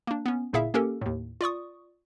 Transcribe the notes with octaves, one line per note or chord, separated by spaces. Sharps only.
A#3 D4
B3 C#4
G1 A#2 E4 G#4 E5 F5
A#3 C#4 G4 A4 A#4
D#2 A2
F4 D5 C#6 D#6